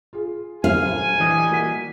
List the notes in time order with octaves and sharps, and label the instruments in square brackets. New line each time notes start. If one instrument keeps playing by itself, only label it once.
[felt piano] F4 G#4
[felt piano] D#1 D2 [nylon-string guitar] F5 [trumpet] G#5
[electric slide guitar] E3 G3 D#5
[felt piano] A#3 F#4 B6